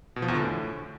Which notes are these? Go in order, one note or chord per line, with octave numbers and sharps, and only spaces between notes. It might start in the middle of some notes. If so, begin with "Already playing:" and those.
B2
F3
E2
D3
A2